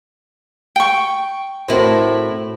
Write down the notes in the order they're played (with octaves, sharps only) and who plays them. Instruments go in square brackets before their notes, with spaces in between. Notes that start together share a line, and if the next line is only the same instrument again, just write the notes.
[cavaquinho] G5 C#6
[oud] A2 E4 A#4 [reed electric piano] C4 F#4 C5